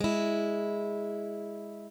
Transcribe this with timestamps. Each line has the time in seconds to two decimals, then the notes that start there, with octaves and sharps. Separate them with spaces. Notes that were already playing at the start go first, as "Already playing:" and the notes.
0.01 G#3 E4